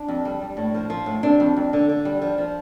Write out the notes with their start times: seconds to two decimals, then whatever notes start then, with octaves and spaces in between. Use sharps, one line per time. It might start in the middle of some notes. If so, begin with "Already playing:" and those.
Already playing: D4
0.08 F2
0.25 G3
0.42 G3
0.57 A2
0.75 F3
0.90 F3
1.06 A2
1.23 C3 D4
1.40 F2
1.57 F2
1.73 D3
1.89 D3
2.05 G3
2.22 F3
2.38 F3